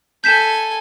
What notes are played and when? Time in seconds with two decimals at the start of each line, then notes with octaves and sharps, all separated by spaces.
0.24 A4 G#5 G6 B6 E7